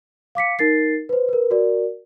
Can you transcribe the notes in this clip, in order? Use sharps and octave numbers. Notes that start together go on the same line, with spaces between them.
F5 D6 B6 C#7
D#4 A#4 A6 C7
B4 C5
A#4 B4
F#4 A#4 D5